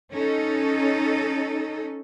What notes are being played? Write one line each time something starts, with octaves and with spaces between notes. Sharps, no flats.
C#4 D#4 A4